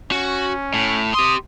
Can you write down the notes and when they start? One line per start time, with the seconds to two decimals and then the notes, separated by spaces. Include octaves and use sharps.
0.11 C#4 F#4
0.74 A2
1.14 G4 C6 D#6